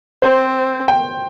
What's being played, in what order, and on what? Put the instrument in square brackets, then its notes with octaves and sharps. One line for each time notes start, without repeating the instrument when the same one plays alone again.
[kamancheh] C4 [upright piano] C5
[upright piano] G5